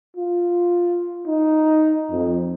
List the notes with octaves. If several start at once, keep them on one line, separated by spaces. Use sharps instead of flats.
F4
D#4
F2